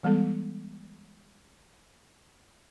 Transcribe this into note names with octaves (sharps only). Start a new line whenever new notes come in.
E3 G3 G#3 B3 A4